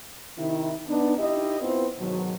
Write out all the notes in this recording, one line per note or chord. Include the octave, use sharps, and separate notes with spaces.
C3 D#3 E4
B3 D4 D#4
D#4 E4 G4 D#5
B3 C4 E4 F4 B4 C5
G#2 B2 D#3 F#3